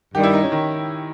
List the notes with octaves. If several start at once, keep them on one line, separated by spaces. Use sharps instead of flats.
G2 D#3 G3 G4
E4
D#4
C#4
D#3